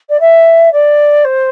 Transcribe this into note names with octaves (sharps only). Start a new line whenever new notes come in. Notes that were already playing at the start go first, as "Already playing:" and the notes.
D5
E5
D5
C5